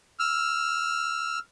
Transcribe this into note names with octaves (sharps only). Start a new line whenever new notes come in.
E6 F6